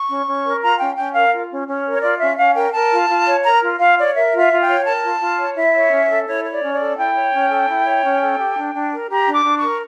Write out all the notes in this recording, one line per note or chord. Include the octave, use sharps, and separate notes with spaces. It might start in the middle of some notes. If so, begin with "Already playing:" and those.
Already playing: C#6
C#4
C#4
A#4
F4 A#5
C#4 G5
C#4 G5
A#4 F5
F4
C#4
C#4
A#4
C#5
F4 D5
C#4 E5
C#4 F5
A#4 G5
A#4 A5
F4
F4
C#5
A#4 A#5
F4
F4 F5
C#5 D5
A#4 E5
F4
E5
F4
G5
C#5
A#4 A5
F4
F4
C#5
E4 E5
C#5
C#4
A4
E4 C#5
C#5
D5
C#4
D5
A4
E4 G5
C#5
C#4
A4
E4
C#5
C#4
A4
G4
D4
D4
A#4
G4 A#5
D4
D6
D4
C#6
A#4